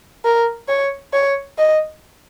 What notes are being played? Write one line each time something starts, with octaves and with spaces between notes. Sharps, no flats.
A#4
C#5
C#5
D#5